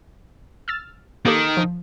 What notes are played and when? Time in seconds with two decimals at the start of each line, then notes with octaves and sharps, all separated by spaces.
0.68 E6 F6 A6
1.25 D#3 A#3 G4 A4
1.57 F3